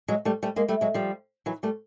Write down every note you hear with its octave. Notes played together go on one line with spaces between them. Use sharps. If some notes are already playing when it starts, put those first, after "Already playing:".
F#3 G#3
G3 A3
G3 A3
G#3 A#3
G3 A3
F#3 G#3
F3 G3
E3 F#3
G3 A3